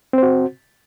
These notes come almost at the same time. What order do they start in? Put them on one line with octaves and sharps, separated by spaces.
C4 C5 F#4